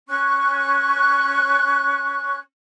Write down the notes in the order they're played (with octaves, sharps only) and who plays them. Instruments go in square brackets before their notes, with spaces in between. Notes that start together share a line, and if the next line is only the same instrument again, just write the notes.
[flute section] C#4 C#6 F#6